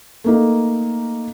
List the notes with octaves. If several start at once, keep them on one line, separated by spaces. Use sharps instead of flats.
A3 A#3 D#4